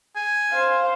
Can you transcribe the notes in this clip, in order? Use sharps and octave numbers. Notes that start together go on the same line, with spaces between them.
G#5
C5 F5